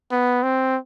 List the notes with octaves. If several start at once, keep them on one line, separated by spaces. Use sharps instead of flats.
B3
C4